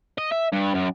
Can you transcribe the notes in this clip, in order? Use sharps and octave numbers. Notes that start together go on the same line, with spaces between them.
D#5
E5
G2
F#2